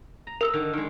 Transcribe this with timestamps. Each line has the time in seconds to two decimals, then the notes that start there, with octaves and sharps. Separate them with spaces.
0.27 A#5
0.41 A#4 E6 F7
0.53 D3 D#3
0.73 D#3 G#3